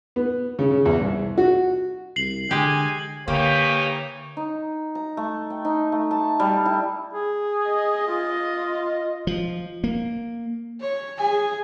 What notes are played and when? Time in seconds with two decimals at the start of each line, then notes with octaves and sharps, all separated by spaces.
0.16 B3
0.59 C#3
0.71 C#3
0.85 E2
1.00 C2
1.38 F#4
2.16 C2 C7 F#7
2.51 D3 G#3 G4 G#5
3.28 D3 E3 A#3 D#4 G4 C#5
4.37 D#4
4.95 A#5
5.17 A3
5.50 G5
5.65 D#4
5.92 A3
6.11 A5
6.40 G3
6.66 E4
7.13 G#4
7.69 D#5
8.08 F4
9.27 F3
9.84 A#3
10.81 C#5
11.18 G#4 G#5